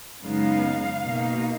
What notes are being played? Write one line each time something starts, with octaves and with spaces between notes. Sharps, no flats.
F#2 C#3 G#3 B3 D#4 F5
B2 A#3 D#4